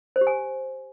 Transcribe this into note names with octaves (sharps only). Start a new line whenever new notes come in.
C5
G4
G#5